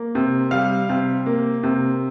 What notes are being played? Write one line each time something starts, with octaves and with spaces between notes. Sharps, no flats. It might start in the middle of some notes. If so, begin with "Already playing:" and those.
Already playing: A#3
C3
G3 F5
C3
A#3
C3